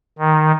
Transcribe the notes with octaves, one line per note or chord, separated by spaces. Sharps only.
D#3